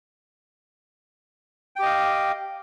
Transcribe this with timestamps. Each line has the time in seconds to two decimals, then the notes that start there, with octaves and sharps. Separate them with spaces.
1.76 G5
1.79 G4
1.83 D#5
1.86 F5